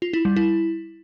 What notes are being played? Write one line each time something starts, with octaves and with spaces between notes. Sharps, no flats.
F4
E4
G3
E4